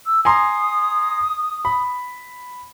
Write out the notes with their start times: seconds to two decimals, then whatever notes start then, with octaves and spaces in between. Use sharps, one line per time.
0.06 E6
0.25 G#5 A#5 C6 D#6
1.65 B5